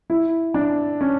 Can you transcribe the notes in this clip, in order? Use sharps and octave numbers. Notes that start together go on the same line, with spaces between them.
E4
D4
C#4